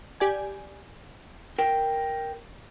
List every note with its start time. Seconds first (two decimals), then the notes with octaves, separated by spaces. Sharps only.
0.20 G4 D5 G#5
1.59 A#4 G5